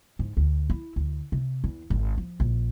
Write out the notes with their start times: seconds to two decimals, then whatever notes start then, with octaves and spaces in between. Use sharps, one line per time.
0.19 G#2
0.37 D2
0.70 E4
0.96 D2
1.32 C3
1.64 E2
1.90 G#1
2.18 F3
2.40 A#1